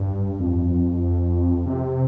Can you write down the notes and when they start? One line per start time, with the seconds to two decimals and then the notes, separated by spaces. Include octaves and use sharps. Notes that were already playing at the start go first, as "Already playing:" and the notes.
Already playing: G2
0.39 F2
1.66 C3